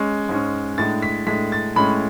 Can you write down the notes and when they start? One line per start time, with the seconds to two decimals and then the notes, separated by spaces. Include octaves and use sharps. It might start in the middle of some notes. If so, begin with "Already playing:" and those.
Already playing: G#3 C#4
0.29 G#2 G#3 C#4
0.78 A2 G#3 D4 A6
1.02 B6
1.27 A2 G#3 D4 B6
1.52 A6
1.76 A2 G#3 C#4 B5